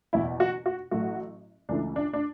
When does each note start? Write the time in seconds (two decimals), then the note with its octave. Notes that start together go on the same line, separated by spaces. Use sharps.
0.13 F#1 E2 B2 E4
0.40 F#4
0.66 F#4
0.91 A1 A2 F#3 A3 F#4
1.69 C#2 C#3 E3 A3 D4
1.96 D4
2.13 D4